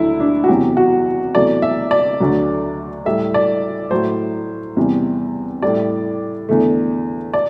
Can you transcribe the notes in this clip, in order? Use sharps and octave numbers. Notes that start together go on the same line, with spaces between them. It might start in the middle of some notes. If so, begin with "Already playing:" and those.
Already playing: D2 D3 F#3 A3 E4
D4
F#4
E2 C3 F#3 G4
F#4
E2 C3 F#3 A3 D5
E5
D5
D2 D3 F#3 A3
A2 G3 E5
D5
A2 F#3 A3 C5
E2 C3 G3
A2 G3 D5
E2 D3 A3
D5